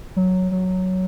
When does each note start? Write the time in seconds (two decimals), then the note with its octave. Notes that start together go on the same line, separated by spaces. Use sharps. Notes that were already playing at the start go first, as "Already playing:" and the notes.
0.16 F#3
0.51 F#3